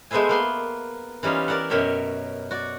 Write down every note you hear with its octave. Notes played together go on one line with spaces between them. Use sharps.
G#3 A3 B3 C5 E5 G#5
A#3 B3 C6
E3 G3 C#4 D#4 F4
A#4 D5 E5 F#5
F#2 B2 A#4 C#5 E5 G5
F#4 D5